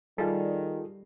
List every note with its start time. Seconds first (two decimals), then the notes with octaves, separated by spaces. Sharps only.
0.18 D#3 G3 F4 G#4 A4